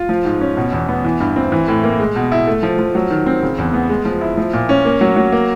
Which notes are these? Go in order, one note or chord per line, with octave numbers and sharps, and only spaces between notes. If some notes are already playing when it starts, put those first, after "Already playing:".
Already playing: F4
F3
G#2
C#4
B2
E2
B3
E3
G2
C4
E3
A2
A#3
G#3
B2
E4
A3
F3
F3
F#3
D#3
C4
C#3
E2
B3
G#3
F3
E4
F3
A#2
C#4
A#3
F#3
F#3
A#3